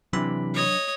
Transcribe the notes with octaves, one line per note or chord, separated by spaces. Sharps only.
C3 E3 F#3 D4 B5
C#5 D#5